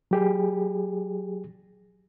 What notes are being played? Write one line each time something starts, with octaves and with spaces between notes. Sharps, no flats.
F#3 G4 G#4